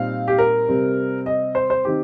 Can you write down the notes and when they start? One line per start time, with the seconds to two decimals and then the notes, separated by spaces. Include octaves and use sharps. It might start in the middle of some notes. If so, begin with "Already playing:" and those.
Already playing: A#2 G3 C4 D#4 F5
0.28 G4
0.38 A#4
0.69 C3 G3 C4
1.26 D#5
1.55 C5
1.70 C5
1.85 D#3 C4 D#4 G4